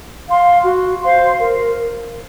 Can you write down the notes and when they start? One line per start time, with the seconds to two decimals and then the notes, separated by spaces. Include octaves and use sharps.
0.28 F5 C6
0.65 F#4
1.02 C5 F5 C6
1.39 A#4